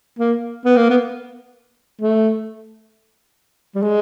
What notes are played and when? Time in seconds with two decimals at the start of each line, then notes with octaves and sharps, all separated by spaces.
0.19 A#3
0.65 B3
0.77 A#3
0.90 B3
2.01 A3
3.75 G3
3.82 G#3